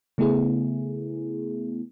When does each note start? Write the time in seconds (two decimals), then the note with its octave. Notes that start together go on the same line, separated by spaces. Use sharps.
0.18 C#3 A3 B3 E4 G#4